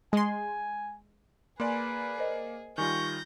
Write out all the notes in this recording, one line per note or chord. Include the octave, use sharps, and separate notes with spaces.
G#3 G#5 C6
A#3 G#4 B4 D5 G#5 A#5 C6
A#4 C5 D#5
D#3 G3 F4 G#5 C#6 G6 A#6